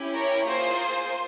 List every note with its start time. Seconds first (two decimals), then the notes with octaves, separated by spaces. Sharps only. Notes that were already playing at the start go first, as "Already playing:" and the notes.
Already playing: C#4 E4 G4
0.15 A#4 C#5
0.46 A#3 F4 G#4 C5